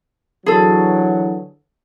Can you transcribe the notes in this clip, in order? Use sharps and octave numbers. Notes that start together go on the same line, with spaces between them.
D3 E3 F#3 G#4 A4